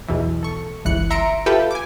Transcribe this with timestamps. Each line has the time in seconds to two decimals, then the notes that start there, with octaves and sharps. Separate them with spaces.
0.09 B1 E2 B2 E3
0.43 A4 C#6
0.85 G1 C#2 E3 F#6 C#7
1.10 E5 A#5 C6 A#6 C#7 D7
1.46 F4 G4 A4 B4 E5 G5
1.71 G#5 D6